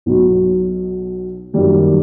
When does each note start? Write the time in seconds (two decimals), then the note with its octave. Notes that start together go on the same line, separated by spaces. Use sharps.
0.06 B1 B2 F#3
1.53 F#2 D#3 G3 A#3